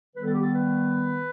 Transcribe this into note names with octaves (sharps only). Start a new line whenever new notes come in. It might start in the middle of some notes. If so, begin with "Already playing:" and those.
D#3 G3 B3 B4
A4
G4
A4
B4